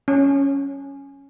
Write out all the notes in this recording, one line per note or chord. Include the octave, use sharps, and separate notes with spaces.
C#4